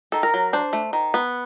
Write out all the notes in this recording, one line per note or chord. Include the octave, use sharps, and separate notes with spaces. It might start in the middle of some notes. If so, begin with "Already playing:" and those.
D#3 A4
A#4
F#3
D4 C5
A3
D#3
B3